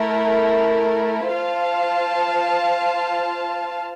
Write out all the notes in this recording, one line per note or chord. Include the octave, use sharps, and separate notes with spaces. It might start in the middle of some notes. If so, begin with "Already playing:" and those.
Already playing: A3 E4 A#4
F4 C5 F5 A5